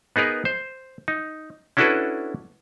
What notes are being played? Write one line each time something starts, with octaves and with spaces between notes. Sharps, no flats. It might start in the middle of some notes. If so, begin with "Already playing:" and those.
B3 D#4 G#4 A#4 B4
C5
D#4
C#4 D4 E4 F#4 A4 B4